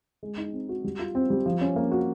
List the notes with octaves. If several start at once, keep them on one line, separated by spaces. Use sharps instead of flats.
G#3
D#4
C4
F#4
G3
F4
C4
G3
F3
C#4
A#3
F#4